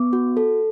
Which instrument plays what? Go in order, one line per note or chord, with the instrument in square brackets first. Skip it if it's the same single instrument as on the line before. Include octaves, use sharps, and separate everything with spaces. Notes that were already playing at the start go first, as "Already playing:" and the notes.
Already playing: [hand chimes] B3 D6
F#4
A4